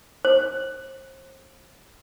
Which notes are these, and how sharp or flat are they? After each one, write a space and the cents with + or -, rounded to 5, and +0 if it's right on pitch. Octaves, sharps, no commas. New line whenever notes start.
C5 +40